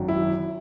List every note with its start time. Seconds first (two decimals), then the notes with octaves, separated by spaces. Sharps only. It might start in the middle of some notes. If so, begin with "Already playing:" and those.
Already playing: G#1 F#2 D#3
0.08 E4